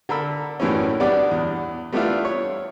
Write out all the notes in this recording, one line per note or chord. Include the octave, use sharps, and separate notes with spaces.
D3 A#4 B5 E6
F#2 A2 E3 G3 C#4
G3 B3 D4 F#4 D5
E2
G3 A3 B3 D4 E4 F4
C#5